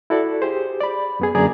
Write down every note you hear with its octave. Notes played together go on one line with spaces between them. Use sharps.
E4 F#4 A4 D5
G4 G#4 C5
D5 B5
F#2 B3 G#4
F#2 D3 A#3 G#4 D5 A#5